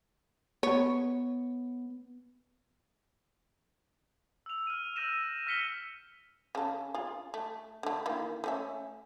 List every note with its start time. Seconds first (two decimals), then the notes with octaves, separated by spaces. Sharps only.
0.63 B3 C#5
4.46 E6 F7
4.67 F6 D#7
4.96 E6 F6 G6 A#6 D#7 E7
5.47 F6 A#6 B6 C#7 G7
6.55 C#3 A4
6.94 F4 G#4
7.34 A3
7.83 D3 A3
8.06 D#3 E3 A#3
8.44 A3 C#4 E5